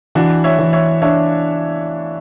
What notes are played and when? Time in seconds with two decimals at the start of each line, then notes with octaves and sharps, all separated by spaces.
0.15 E3 D4 F#4
0.44 C#5 E5
0.58 E3
0.73 C#5 E5
1.02 D4 C#5 E5